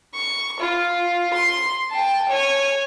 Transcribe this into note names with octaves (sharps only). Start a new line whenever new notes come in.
C#6
F4
C6
G5 A5
C#5 G#5